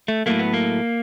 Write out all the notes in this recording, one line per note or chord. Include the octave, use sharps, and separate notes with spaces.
A3
A2 F#3 A3 A#3
B3
A#3